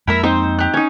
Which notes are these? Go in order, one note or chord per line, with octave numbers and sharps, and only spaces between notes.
F2 G#3 A#3 E4 A#4 E5
C4 D#4 C5
G4 F#6
C#4 D#4